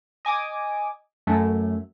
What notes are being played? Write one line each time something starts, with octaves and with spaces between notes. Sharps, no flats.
D#5 G#5 D6 D#6
F#2 A3